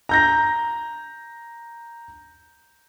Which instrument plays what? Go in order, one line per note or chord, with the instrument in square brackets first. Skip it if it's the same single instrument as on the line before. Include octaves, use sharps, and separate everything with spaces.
[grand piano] A#5 G6 A#6